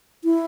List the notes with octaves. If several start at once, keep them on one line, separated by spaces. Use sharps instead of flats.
E4